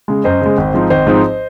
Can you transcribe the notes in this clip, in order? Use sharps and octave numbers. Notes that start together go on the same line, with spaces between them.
C#3 G#3
F#2 C5 D#5
C#3 G#3
G#1
G#2 F3 C4 D#4
G#1 C5 D#5
G#2 F3 C4 D#4